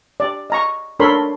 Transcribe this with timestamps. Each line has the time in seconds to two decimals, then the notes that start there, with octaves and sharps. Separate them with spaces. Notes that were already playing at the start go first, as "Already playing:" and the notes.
0.20 D5
0.50 D#5 A#5 C#6
1.00 D4 A4 A#4 C#5 B5 C6